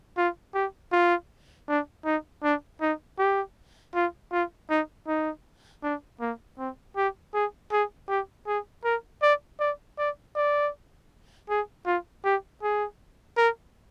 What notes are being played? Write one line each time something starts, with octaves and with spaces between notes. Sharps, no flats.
F4
G4
F4
D4
D#4
D4
D#4
G4
F4
F4
D#4
D#4
D4
A#3
C4
G4
G#4
G#4
G4
G#4
A#4
D5
D5
D5
D5
G#4
F4
G4
G#4
A#4